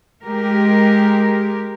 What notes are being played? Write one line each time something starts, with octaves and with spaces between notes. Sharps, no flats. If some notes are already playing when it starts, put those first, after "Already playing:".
G#3 G4 A#4